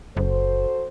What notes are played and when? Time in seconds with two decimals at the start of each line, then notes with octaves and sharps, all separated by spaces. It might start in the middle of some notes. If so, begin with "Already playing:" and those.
0.17 F#1 F#4 A4 C5